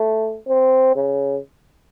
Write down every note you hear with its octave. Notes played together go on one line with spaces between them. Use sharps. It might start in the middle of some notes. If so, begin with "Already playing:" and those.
Already playing: A3
C4
C#3